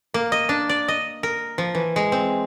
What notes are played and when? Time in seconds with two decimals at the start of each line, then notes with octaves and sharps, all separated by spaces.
0.14 A#3
0.32 D#5
0.49 D4
0.69 D5
0.88 D#5
1.23 A#4
1.58 F3
1.75 E3
1.96 G#3
2.12 C4